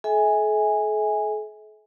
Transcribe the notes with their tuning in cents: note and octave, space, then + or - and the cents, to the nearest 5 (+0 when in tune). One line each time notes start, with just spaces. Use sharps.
A4 -45 E5 -35 G#5 -10